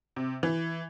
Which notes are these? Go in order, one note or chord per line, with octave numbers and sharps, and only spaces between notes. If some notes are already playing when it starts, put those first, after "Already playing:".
C3
E3